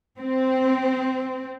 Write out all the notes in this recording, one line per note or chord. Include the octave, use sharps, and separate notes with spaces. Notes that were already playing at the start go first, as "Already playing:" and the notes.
C4